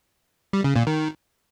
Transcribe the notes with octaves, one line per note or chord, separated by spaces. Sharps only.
G3
C#3
A#2
D#3